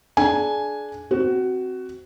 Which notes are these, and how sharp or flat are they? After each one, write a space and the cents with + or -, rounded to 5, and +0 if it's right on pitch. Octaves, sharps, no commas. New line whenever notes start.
D4 -5 G#4 +35 G#5 +0
C4 -5 F#4 +15